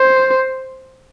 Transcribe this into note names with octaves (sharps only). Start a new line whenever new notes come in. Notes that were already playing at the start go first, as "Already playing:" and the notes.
Already playing: C5